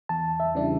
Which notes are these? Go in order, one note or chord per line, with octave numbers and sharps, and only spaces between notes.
E2 A5
E5
C#3 E3 G3 D4